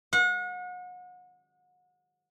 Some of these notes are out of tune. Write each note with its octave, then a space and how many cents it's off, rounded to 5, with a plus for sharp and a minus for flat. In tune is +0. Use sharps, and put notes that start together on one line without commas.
F#5 -35